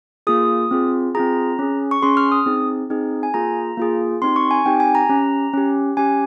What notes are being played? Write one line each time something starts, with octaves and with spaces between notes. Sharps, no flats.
A#3 F4 G#4 D#6
C4 F4 G#4
C4 F4 G#4 A#5
C#4 G#4
C#6
C#4 G#4 C6
F6
D#6
C4 D#4 G#4
C4 D#4 G#4
G#5
A#3 F4 G#4 A#5
A#3 F4 G#4
C4 D#4 G4 C6
C#6
G#5
C4 D#4 G4 G5
G#5
A#5
C#4 G4
C#4 G4
C#4 G4 G#5